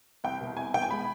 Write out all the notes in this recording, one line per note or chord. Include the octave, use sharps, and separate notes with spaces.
C2 G5
B2
C2 G#5
B2 G5
G#5
G#3 B5